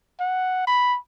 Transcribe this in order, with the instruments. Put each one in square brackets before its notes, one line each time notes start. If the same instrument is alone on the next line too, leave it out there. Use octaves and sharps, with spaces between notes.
[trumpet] F#5
B5